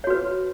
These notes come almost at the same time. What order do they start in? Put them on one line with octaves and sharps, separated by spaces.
C#5 F#4 B4